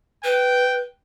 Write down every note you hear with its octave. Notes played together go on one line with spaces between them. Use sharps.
B4 G5